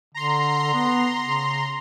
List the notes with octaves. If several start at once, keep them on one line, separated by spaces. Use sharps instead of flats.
D3 A#5 C6
B3
C#3